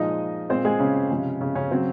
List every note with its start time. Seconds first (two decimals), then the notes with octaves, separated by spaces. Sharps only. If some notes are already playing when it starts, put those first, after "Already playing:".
Already playing: A#2 F3 G#3 D#4 D#5
0.49 A#2 G#3 C4 C5
0.65 G#3 G#4
0.80 C#3 C#4
1.11 C3 F3 G#3
1.41 C#3 C#4
1.55 C#3 C#4
1.71 C#3 F#3 C4